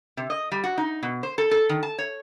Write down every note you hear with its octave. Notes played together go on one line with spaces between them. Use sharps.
C3
D#5
G3
F#4
D#4
B2
C5
A4
A4
D#3
A5
C#5